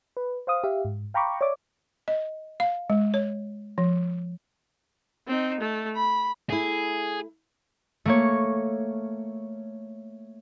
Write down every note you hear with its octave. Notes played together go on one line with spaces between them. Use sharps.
B4
C5 F5 D#6
G4 E5 F5
G#2
F5 G5 A#5 B5 C#6 D6
C#5 D5 E5 D6
D#5
F5
G#3
C#5
F3
C4 D#4
A3
B5
A3 E4 G#4
A3 A#3 C#5